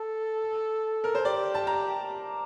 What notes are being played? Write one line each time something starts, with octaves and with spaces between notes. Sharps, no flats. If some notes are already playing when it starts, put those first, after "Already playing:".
Already playing: A4
A#4
C5
G4 D5
A5
A#5